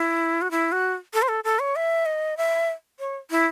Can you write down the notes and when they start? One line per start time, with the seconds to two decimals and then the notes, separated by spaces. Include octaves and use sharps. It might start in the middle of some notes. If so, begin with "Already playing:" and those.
Already playing: E4
0.42 F#4
0.51 E4
0.72 F#4
1.14 A4
1.22 C5
1.28 A4
1.44 A4
1.59 C#5
1.76 E5
2.06 D#5
2.37 E5
3.00 C#5
3.31 E4